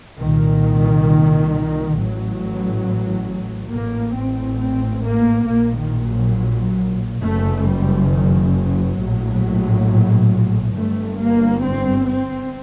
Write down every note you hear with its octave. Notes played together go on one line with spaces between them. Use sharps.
C2 A#2 D#3
A1 A2 F#3
A1 A2 A#3
C4
C4
A#3
A#1 A#2 A#3
D#3
F#3
F#1 F#2 A3
G3
D#3
F#3
A#1 A2
G1 G2 A3
A#3
C4
C4